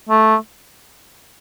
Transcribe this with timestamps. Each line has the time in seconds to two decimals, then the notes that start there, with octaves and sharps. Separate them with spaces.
0.09 A3